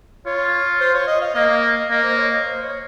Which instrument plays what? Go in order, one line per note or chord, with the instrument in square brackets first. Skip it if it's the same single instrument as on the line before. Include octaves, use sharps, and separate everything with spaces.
[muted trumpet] F4 [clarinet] C#5
[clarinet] C5
C#5
D#5
F5
[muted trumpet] A#3 [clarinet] D#5
[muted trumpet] A#3 [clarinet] D#5
[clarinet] C5
C#5
D#5
C5
C#5